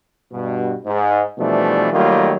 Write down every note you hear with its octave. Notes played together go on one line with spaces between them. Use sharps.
G2 B2
G#2
B2 E3 F3 G3 A3 D4
D#3 F#3 G3 A3 A#3 F4